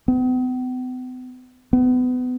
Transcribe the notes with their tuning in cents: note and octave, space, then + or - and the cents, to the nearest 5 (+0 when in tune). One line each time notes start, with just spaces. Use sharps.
B3 +45
B3 +30